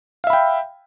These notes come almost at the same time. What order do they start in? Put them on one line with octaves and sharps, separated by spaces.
F5 E5 B5 G5